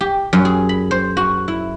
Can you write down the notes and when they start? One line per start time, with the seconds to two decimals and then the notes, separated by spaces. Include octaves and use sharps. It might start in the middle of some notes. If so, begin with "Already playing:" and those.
0.01 G4
0.33 F#2
0.45 G#4
0.69 B5
0.91 C5
1.17 F#4
1.48 E4